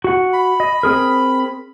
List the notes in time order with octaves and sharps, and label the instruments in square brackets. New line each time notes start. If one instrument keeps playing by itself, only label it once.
[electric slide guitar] F#4 F#5
[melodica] B5
[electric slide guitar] D#5
C4 G#4 A#4